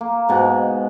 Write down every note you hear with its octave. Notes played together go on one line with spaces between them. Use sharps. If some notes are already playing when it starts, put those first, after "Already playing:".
A#3
G#2 B2